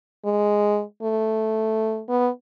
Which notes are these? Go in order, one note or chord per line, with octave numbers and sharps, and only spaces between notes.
G#3
A3
B3